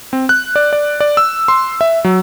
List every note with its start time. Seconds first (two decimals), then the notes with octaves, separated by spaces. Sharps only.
0.13 C4
0.29 F#6
0.56 D5
0.73 D5
1.00 D5
1.17 E6
1.48 C6
1.81 E5
2.04 F#3